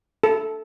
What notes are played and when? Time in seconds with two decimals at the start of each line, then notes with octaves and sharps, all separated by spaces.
0.23 A4